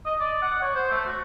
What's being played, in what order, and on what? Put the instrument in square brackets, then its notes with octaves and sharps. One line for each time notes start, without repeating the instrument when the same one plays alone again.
[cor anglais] D#5
D5
F#5
C#5
C5
A3
F#4